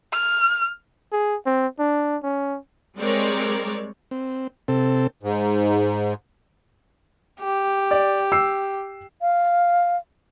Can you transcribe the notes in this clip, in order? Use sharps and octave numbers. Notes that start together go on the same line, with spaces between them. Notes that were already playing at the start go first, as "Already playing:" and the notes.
F6
G#4
C4
D4
C#4
G3 G#3 C4 A#4 C#5 D5
C4
C3 C4 A4
G#2
G4
D5
E6 C7
F5